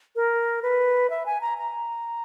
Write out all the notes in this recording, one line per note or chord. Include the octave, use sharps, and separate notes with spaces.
A#4
B4
E5
G#5
A#5
A#5